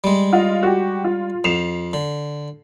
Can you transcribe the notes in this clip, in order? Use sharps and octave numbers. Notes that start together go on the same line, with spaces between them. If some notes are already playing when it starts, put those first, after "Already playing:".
G3 G#3
F4 D#5 F5
F#4 G4
F4
F2 C7 E7 F7
D3